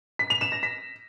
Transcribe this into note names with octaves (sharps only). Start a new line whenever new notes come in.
B6
F7
E7
A#6
B6